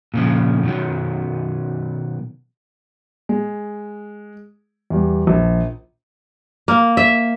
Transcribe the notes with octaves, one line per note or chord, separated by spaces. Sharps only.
A#2 C#3 F3
B2 D#3 F#3
G#3
E2 G3
A#1
A#3
E5